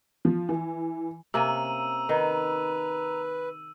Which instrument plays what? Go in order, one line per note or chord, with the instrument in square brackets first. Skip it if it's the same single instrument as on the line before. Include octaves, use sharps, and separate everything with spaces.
[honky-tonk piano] F3
E3
[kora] C3 A#3 C#4 [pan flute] A#5 [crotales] E6 D#7
[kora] D#3 [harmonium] B4